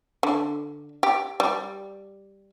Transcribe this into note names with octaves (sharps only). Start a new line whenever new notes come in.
D3
G4
G3